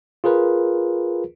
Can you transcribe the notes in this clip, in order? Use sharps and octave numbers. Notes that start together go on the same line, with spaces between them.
F4 G#4 A#4 B4